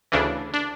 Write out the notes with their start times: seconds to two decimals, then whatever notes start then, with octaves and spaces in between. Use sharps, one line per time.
0.12 D2 C#3 E3 D4
0.54 D4